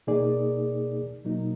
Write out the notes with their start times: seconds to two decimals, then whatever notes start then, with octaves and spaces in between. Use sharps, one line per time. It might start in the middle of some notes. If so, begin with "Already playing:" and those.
0.07 B2 A#3 D#4 G#4 D5
1.25 B2 F#3 A#3 D#4